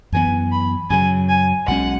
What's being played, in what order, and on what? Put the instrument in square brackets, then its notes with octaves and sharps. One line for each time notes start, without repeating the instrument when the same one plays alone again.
[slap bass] F#2 E3 B3 [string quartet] G#5
[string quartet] B5
[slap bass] F#2 C#3 F#3 [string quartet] G#5
[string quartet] G#5
[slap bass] B1 B2 G#3 C#4 [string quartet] F#5